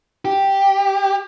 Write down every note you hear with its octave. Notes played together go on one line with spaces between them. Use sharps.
G4